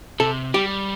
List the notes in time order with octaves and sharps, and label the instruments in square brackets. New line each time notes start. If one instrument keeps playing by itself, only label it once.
[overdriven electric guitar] C3 [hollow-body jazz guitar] A4
[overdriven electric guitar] G3 [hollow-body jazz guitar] G4